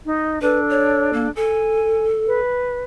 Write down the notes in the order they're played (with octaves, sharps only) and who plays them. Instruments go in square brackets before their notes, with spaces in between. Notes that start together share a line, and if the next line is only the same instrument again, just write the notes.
[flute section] D#4 D#5
[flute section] D4 A4 [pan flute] B4
[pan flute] C#5
A#3
[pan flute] A4 [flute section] G#5
[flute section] B4